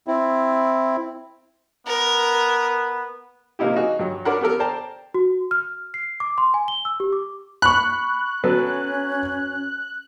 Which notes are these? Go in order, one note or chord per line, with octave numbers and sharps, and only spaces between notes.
C4 E4
B3 A#4
C3 F3 A#3 D#4 E4 G4
D#4 F#4 G#4
G2 F#3
D4 F#4 A#4 B4 C#5 F#5
B3 G4 A4 A#4
C5 D5 G5 A5 A#5
F#4
F6
C7
D6
C6
G#5
G7
E6
G4
D6
B5 C#6 F#6
F#3 B3 C#4 A4